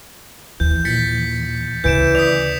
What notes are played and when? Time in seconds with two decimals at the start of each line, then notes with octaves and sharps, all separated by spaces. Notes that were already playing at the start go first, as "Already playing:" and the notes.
0.60 D#2 E3 G6
0.85 A#2 E3 A6 B6 C#7
1.84 D2 C#3 E3 G6 D7 E7
2.15 D5 D#6 B6 F7